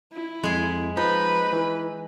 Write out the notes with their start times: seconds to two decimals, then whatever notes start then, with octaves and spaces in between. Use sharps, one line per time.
0.13 E4
0.43 F2 G#3 G#4
0.97 F3 D#4 B4 B5
1.53 E3